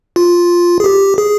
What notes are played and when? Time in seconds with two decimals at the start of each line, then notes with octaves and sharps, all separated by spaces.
0.16 F4
0.80 G#4
0.84 G4
1.18 G#4